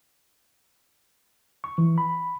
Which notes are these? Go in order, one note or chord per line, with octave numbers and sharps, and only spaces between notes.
C#6
E3
B5